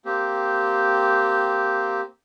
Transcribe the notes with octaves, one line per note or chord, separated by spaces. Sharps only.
A#3 C4 G4